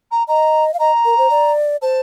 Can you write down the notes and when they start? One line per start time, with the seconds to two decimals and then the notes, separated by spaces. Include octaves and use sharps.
0.11 A#5
0.28 D#5 A#5
0.74 F5
0.79 D#5 A#5
1.05 A#4
1.18 C5
1.30 D5
1.82 C5 A5